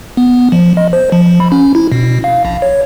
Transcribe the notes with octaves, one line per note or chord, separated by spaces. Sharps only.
B3
F3
D#5
C5
F3
B5
C#4
E4
B2
F5
A#1
C#5